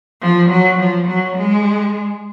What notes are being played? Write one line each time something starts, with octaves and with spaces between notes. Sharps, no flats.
F3
F#3
F3
F#3
G#3